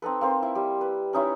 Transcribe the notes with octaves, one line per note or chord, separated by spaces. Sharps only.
C4 D#4 A4 B4
A#3 C4 C5
E4
G3
B4
C#4 D#4 E4 C#5